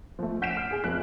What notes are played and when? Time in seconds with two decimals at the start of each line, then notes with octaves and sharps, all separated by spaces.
0.19 F3 A3
0.42 F#5 G6 B6 C7 D7 E7
0.57 F6
0.71 G#4
0.84 F1 F3 F#6